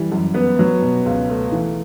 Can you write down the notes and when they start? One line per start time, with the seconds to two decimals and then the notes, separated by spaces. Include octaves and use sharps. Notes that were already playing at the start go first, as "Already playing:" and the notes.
Already playing: E3 G3
0.12 F#2
0.34 B3
0.59 F#3
0.82 B2
1.06 C#2
1.30 A3
1.52 E3